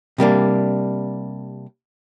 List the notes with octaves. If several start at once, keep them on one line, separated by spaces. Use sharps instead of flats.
C3 G3 A#3 D4